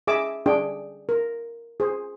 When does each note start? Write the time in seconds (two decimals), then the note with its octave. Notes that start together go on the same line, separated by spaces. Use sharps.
0.07 G#4 D#5 E5 G#5 D6 E6
0.46 D4 G#4 G5
1.09 A#4
1.80 G#4 C5